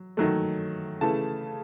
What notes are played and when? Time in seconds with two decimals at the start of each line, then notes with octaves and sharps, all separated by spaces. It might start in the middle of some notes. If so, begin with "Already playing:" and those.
Already playing: F#3
0.17 D#3 F#3 A3
1.01 C#3 E3 A3 A5